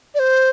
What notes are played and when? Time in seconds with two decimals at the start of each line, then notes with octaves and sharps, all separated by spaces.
0.15 D5
0.19 C5